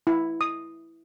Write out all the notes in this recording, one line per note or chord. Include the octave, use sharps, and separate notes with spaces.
E4
D#6